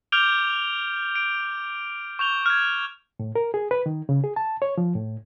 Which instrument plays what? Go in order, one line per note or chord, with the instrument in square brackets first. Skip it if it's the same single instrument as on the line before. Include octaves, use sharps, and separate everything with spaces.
[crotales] D6 F6 G6 D7 F7 G7
D7
C#6 G6 F7 G7
F6 G#6
[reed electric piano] A2
A#4
G#4
B4
D#3
C#3
G#4
A5
C#5
F3
A2